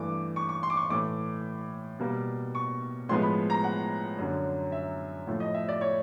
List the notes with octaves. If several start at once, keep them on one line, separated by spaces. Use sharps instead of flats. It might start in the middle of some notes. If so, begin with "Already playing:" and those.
Already playing: G2 E3 A3 D6
C#6
C#6
C6
D6
C#6
A2 E3 A3 D6
B2 G3 A#3
C#6
A2 F3 G#3 B3 C6
B5
A#5
F#5
F#2 D3 F#3
E5
A2 F3 A3
D#5
E5
D5
C#5